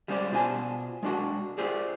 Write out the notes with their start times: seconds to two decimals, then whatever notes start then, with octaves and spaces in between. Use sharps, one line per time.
0.08 G3 G#3 C#4 C5 D5
0.32 B2 F4 C5 G#5 A5
1.03 G#3 D4 F#4
1.58 F4 G4 G#4 C5 D5